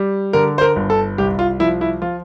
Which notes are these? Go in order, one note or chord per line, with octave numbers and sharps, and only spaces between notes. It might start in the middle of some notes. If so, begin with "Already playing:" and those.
Already playing: G3
D3 A#4
C5
A#4
G1
A4
C2 G4
F4
F3 E4
E4
F3 F4